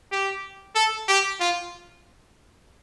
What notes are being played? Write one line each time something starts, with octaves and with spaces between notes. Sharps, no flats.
G4
A4
G4
F4